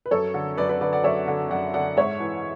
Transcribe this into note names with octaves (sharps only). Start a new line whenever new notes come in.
B4
F#2 A4 C#5
D3
F#2 B4 D5
B4 D5
D3 B4 D5
D5 F#5
F#2 C#5 E5
D3
F#2 D5 F#5
D3 D5 F#5
G#2 C#5 E5
E3